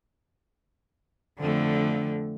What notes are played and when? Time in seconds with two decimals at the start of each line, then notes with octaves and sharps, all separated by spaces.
1.40 F2 D3 A3